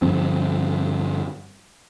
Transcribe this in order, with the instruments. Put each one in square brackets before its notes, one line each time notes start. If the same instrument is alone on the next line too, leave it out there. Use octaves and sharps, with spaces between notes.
[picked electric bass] G2 D3 F3 C4